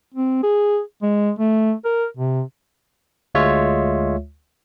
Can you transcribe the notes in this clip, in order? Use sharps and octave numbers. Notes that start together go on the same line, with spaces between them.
C4
G#4
G#3
A3
A#4
C3
D2 G#3 F4 C#5 E5